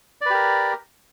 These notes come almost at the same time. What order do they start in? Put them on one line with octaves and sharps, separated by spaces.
D5 B4 G4 A#4